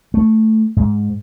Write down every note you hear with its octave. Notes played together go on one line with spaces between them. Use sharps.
A3
G#2